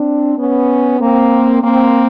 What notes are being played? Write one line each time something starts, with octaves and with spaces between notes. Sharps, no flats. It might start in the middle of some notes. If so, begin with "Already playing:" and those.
Already playing: C4 D4
B3 C#4
A#3 C4
A#3 C4